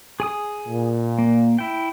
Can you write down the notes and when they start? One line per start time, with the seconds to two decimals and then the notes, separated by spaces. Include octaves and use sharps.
0.20 G#4 G#5 D#6
0.67 A#2
1.18 A#3
1.59 E4 G5